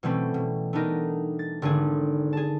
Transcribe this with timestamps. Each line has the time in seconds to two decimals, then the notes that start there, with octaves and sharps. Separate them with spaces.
0.03 B2 E3 G3 A3 C4 C#4
0.34 B2
0.73 A3 B3 D4 D#4 A#4
1.39 A6
1.62 G#1 D3 D4 G#4
2.33 G#4 A5